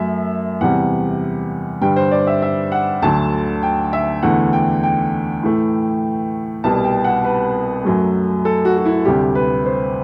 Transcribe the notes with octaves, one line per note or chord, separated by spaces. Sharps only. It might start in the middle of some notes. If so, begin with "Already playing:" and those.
Already playing: F#2 F#3 A3 E5
E2 C3 G3 F#5
G2 D3 G3 G5
C5
D5
E5
E5
F#5
D2 D3 F#3 A3 A5
G5
E5
E2 D3 A3 F#5
G5
G5
A2 E3 A3
C2 B2 G3 A5
G5
F#5
B4
F#2 F#3 A3
A4
F#4
F#4
E4
D2 C3 G3 G4
B4
C5